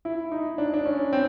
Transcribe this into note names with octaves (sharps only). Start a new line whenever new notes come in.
E4
D#4
D4
D4
C#4
C4